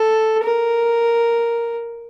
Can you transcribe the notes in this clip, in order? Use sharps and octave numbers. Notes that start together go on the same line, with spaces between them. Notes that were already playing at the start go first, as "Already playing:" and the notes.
Already playing: A4
A#4